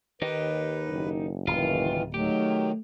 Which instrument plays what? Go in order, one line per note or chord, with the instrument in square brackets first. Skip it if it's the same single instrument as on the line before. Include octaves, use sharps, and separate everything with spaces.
[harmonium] D#2 B4 [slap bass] D#3 [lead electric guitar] D#4 G4
[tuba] F#1
[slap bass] D1 [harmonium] D#3 E3 [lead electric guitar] F4
[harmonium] D#3 F#3 [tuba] A3 [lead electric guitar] G4